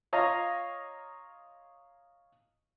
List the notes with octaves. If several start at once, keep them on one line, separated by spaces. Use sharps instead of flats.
F4 C#5 D#5 F5 A#5